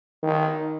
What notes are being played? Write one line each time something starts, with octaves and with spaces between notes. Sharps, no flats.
D#3